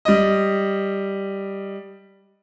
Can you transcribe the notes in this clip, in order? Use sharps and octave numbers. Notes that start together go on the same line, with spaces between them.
G3 D#5